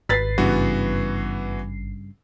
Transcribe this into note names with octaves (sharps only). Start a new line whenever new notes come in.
G#1 B4 A6 B6 C7
G2 C#3 E3 B3 F#4